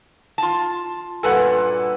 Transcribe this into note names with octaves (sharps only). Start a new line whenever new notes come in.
F4 A5
G2 A#2 A4 B4 F#5 G#5